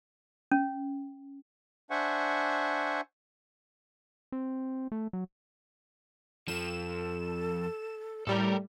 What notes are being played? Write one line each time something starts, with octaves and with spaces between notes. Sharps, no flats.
C#4
D4 C5 E5 F#5 G#5 C#6
C4
A3
F#3
F2 F3 A4 E7
A2 G3 A4 A#4 D5